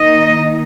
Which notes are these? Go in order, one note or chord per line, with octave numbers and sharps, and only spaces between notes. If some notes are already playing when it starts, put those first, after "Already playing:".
Already playing: D#3 A#3 D#4 D#5